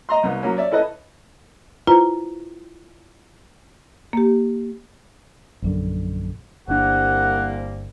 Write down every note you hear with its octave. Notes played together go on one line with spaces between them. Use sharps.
D#5 A#5 C6
C2 B3
F#3 A#3 C#4
C#5 D5 E5
C#4 E4 A4 B4 D#5
E4 F4 B4 C5 A#5
A#3 G4
A#1 F#2 D3
G1 C2 A#3 D4 F#5